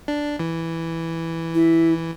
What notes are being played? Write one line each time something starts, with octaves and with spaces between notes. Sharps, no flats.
D4
E3
E4